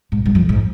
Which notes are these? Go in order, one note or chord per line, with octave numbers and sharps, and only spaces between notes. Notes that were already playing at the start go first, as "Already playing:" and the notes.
G#2
G2
F2
G#2